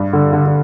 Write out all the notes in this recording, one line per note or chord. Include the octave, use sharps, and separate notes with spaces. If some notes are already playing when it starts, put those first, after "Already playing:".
Already playing: G2
D3
D3
D3